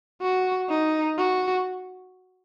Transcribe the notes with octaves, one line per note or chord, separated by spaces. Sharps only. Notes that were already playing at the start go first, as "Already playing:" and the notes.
F#4
D#4
F#4